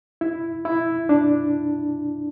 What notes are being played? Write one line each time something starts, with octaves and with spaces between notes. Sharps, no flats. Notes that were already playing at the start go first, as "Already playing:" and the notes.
E4
E4
D4